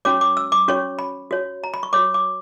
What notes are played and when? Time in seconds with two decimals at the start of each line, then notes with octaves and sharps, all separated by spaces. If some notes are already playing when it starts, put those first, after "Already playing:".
0.05 C#4 F#4 C#5 D6
0.21 D6
0.37 E6
0.52 D6
0.68 C#4 F#4 C#5 C#6
0.99 B5
1.31 F#4 C#5
1.64 A#5
1.74 B5
1.83 C#6
1.93 F#4 C#5 D6
2.14 D6